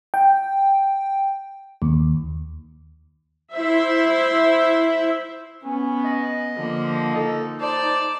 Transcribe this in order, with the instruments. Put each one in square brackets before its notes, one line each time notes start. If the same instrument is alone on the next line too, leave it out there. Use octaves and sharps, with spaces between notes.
[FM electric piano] G5
D#2
[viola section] E4 C5 E5
[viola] B3 [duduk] C#4
[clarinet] D#5
[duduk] D3 [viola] F3 A#3
[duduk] D#4 [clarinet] A4
[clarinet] C5 [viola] D5 A5